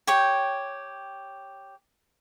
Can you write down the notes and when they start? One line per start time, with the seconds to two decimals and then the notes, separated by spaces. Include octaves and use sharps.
0.07 G4 C#5 G5